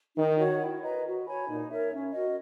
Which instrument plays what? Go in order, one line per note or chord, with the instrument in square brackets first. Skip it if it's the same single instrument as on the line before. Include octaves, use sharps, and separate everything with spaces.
[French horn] D#3 [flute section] D#4
[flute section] F#4 C#5 F#5
E4
B4 D#5 A#5
F#4
C#5 G#5 B5
[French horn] A#2 [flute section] D#4
[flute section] A#4 C#5 E5
C#4
F#4 A#4 D#5